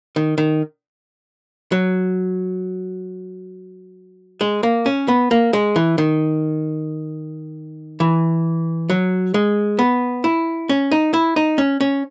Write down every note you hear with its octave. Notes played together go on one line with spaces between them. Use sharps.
D#3
D#3
F#3
G#3
A#3
C#4
B3
A#3
G#3
E3
D#3
E3
F#3
G#3
B3
E4
C#4
D#4
E4
D#4
C#4
C#4